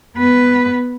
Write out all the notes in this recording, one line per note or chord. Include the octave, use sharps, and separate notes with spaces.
B3 B4